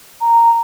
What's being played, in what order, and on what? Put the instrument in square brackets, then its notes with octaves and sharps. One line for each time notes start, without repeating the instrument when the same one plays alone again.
[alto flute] A#5